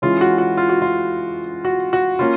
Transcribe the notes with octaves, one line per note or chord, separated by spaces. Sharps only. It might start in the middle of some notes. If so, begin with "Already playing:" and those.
E3 G#3 C#4 F4
F#4
F#4
F4
F#4
F4
F#4
F#4
A#3 C#4 F4